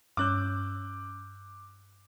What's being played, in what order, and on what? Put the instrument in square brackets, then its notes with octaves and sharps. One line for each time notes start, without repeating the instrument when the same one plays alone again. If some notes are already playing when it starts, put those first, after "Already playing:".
[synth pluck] G2 C#4 E6 [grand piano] D6 F#6 G6